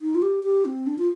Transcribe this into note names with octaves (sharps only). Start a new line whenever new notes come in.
D#4
F4
G4
G4
C4
D4
F4